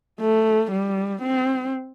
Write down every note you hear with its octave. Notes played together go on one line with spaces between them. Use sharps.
A3
G3
C4